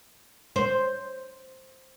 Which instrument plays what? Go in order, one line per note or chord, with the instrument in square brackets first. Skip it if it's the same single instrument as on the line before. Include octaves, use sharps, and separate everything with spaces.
[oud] C5